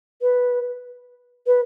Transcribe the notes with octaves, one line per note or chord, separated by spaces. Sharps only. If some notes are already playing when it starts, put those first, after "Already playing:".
B4
B4